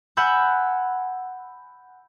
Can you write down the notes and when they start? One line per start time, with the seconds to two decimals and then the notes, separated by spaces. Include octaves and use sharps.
0.17 F#5 G#5 B5 E6 F#6 G6